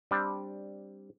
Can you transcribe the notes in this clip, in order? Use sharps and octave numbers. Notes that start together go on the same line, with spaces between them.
G3 C4 D4